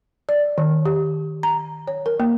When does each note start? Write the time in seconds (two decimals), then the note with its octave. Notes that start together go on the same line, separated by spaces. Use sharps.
0.29 D5
0.58 D#3
0.86 G4
1.43 A#5
1.87 C#5
2.06 A#4
2.20 A#3